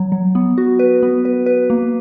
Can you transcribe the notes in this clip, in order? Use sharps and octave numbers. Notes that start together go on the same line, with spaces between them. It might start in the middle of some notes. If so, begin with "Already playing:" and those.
Already playing: F#3
F#3
B3
F#4
B4
B3
B4
B4
A#3